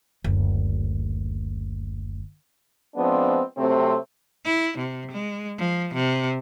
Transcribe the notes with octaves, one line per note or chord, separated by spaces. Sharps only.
F#1 D2
F3 G#3 B3 C4 D4
C3 F#3 A3 C4
E4
C3
G#3
F3
C3